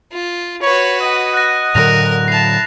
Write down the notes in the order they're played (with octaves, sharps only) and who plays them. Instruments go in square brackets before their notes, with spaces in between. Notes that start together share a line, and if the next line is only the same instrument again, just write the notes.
[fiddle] F4
[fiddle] F#4 B4 [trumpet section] C#5
[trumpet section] D#5 F#5 D#6
[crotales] F#6 A#6
[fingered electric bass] A2 D3 F#3 [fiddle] A#4 [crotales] F#6 A#6 F7
[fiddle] E4 A5 [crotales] C7 F7